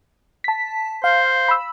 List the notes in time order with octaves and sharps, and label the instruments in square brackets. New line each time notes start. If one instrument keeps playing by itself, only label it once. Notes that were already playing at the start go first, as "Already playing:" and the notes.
[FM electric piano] A5 B6
[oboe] C5 [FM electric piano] F5
[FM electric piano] B5 E6